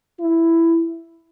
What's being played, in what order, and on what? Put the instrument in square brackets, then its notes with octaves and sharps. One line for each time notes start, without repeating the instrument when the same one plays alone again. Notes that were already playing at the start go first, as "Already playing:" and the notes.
[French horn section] E4